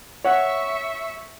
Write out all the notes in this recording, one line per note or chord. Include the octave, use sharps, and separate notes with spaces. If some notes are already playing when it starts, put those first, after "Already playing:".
C#5 E5 F#5 C#6